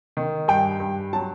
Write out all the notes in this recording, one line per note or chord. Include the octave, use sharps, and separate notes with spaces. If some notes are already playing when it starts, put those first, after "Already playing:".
D#3
G2 G5
G2
F#3 A5